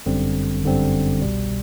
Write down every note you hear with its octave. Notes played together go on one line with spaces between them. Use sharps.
G1 F#2 D3 G3 C4
G1 F#2 D3 G3 C4
C2 B2 G3